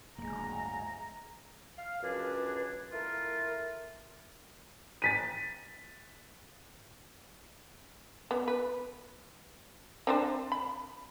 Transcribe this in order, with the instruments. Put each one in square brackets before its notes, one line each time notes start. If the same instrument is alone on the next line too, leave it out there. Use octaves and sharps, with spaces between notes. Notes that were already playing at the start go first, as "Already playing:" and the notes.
[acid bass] D1 [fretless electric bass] G2 C#3 A#3 [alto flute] G#3 [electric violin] A#5
[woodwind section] F5
C#2 F#2 D4 G#4 B4
A3 E4 F4 A#4
[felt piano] A6 B6 D#7
[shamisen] B3
B4
C4 D4 C5
B5